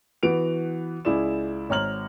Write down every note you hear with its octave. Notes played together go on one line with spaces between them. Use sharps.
E3 B3 F#4 D7 F7
C#2 E4 G#4 D5 E7
G#1 C#5 A#5 F6 F#7